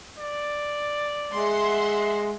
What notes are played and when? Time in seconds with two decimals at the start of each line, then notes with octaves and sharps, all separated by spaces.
0.19 D5
1.32 G#3 E5 F#5 C6